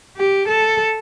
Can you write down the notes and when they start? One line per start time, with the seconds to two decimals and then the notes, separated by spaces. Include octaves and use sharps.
0.17 G4
0.48 A4